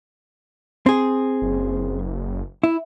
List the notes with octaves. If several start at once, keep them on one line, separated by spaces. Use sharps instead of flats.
C4 G#4
F#1
E4